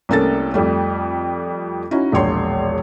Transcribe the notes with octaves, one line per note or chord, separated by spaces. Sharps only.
C2 A3 A#3 C#4 A4 A6
F2 F3 G3 A3
C#4 D#4 E4 F#4
E1 A#1 C#5 C6